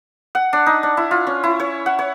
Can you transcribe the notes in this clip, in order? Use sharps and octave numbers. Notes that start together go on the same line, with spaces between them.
F#5
D4
D#4
D4
E4
F4
C#4
E4
C#5
F#5
C#5